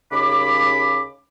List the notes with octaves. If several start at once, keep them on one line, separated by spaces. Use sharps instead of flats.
D#2 C#3 B5 D6